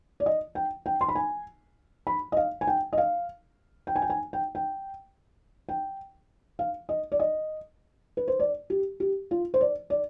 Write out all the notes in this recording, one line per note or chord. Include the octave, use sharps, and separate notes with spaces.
D5
D#5
G5
G5
C6
B5
G#5
B5
D#5
F5
G#5
G5
D#5
F5
G5
G#5
G5
G#5
G5
G5
G5
F5
D#5
D5
D#5
B4
C5
D5
G4
G4
F4
C5
D5
D5